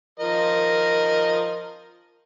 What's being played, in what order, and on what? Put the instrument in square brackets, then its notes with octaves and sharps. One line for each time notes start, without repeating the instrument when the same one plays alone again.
[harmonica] F3 A#4 D#5